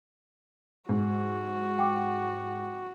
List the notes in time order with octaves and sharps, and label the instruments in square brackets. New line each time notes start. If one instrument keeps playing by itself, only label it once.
[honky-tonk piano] G#2 [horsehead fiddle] F#4
[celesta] F#5 G5 D6